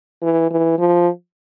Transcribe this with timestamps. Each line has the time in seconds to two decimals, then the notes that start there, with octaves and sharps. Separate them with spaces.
0.22 E3
0.51 E3
0.79 F3